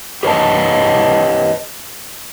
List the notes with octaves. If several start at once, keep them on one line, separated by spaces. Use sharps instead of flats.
G4 B4 C#5 D#5 A5